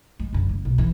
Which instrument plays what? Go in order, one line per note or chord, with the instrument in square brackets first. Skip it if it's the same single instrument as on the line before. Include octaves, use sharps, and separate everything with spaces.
[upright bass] G#3
F#2 D3
F#1
B1
E3